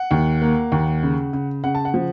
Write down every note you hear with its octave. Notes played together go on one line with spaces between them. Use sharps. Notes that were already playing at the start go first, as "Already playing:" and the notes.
Already playing: F#5
D#2
A#3
D#2
C#3
C#3
C#3 F#5
A5
F#5
F3